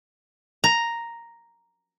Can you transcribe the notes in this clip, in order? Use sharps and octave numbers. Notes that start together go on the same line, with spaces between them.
A#5